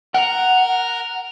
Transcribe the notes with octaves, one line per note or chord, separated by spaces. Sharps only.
A#4 F#5 A#5